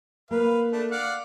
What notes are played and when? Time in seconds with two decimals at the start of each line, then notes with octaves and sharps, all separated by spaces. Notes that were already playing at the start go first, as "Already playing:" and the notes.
0.31 A#3 B4 F5
0.72 A3 D4
0.91 D5 F5 F#5